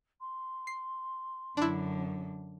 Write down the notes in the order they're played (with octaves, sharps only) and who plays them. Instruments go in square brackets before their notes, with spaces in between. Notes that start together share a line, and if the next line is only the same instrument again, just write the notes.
[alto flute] C6
[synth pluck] C7
[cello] F#2 D3 [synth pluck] D4 E4